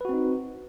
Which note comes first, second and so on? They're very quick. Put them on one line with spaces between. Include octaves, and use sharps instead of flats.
B4 F#4 C4 D#4